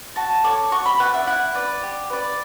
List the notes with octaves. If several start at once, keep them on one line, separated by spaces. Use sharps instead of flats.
F#4 A5
A4 C#5 D6
F#4 C#6
B5
B4 D5 F#5
E5
E4 F#5
B4 D5
G4
B4 D5